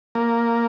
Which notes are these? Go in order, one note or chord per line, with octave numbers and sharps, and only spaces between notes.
A#3